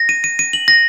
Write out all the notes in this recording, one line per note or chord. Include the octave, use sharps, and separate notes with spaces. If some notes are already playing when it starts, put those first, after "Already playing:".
Already playing: A#6
D#7
D#7
D#7
F#7
A#6